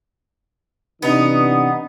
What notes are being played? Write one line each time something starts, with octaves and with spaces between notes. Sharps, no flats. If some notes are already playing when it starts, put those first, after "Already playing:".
C3 E3 B3 D4 D#4